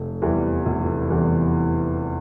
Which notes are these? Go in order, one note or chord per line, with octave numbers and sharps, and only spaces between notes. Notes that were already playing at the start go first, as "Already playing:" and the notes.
Already playing: F1
E2 E3 G3
F1
E2 E3 G3